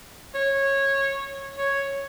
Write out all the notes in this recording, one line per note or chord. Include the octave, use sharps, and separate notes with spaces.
C#5
C#5